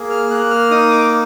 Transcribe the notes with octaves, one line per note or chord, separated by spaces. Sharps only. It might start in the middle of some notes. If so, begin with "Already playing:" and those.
Already playing: A#3 G#4
F6
A#3 F#6
F6
D#4 D#6
D6